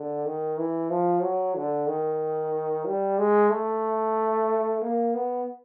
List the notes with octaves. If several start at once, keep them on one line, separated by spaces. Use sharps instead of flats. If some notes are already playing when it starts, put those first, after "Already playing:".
Already playing: D3
D#3
E3
F3
F#3
D3
D#3
G3
G#3
A3
A#3
B3